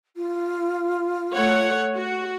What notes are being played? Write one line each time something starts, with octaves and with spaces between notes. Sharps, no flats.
F4
A3 C#5 F#5
F#4